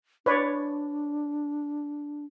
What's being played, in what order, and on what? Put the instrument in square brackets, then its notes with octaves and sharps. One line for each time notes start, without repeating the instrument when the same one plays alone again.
[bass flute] D4 [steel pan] B4 C#5 D5